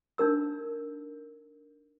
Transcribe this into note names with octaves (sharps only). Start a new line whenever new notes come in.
D4 D#4 A#4 E6